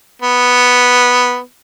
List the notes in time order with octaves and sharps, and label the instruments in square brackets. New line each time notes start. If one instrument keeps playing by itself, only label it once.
[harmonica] B3